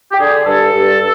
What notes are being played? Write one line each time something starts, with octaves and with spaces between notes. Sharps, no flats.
G4
D3 G#4
G2 A4
G2